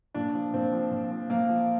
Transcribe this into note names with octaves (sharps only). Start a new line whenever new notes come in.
A#2 D4
F3
A#2 C4
F3
A#2
F3
A#2 A#3
F3